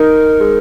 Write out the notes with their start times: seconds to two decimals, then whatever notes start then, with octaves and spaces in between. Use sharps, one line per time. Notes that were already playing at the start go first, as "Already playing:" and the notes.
Already playing: D#4 A#4
0.40 G#3